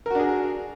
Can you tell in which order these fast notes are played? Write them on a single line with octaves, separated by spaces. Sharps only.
A#4 F#4 D4 G#4